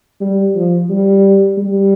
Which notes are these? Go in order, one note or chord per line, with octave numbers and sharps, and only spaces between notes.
G3
F3
G3
G3